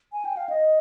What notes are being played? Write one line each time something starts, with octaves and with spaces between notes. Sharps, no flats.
G#5
G5
F5
D#5